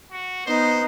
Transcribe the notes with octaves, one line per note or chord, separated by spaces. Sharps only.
F#4
B3 D#4 C5